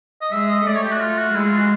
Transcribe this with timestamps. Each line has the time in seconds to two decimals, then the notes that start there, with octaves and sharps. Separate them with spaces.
0.21 D#5
0.32 G#3 E5
0.49 D#5
0.66 A3 D5
0.75 C#5
0.83 G4
0.92 F#4
1.01 F4
1.18 F#4
1.35 G#3 E4
1.46 F4
1.58 F#4